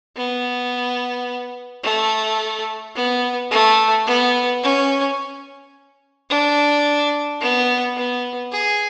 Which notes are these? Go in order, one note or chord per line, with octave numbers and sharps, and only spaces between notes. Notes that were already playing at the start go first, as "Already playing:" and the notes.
B3
A3
B3
A3
B3
C#4
D4
B3
B3
G#4